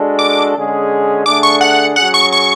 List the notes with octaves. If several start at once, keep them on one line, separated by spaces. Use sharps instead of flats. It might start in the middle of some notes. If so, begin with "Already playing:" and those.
Already playing: G#3 D4 F#4 A4
D6
D3 G#3 C#4 G#4
D3 A3 D4 G#4 D6
C#6
F#5
F#3 C#4 G#4 F#5
C#6
C#6